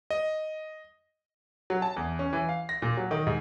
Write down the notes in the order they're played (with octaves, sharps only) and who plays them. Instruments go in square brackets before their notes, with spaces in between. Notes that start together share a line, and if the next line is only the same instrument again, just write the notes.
[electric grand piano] D#5
[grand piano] F#3
A5
E2
C#4
E3
F5
A#6
A#2
F#3
D#3
G#2